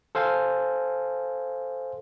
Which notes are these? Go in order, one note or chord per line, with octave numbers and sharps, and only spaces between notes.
A4 C5 F5 G#5